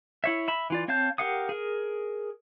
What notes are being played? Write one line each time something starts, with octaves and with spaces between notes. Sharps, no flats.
E4 C#5 E5
E5 B5
E3 F4 D5
C4 C#5 F5 A5 G6
G4 A#4 F5 F#5 D#6
G#4 A#4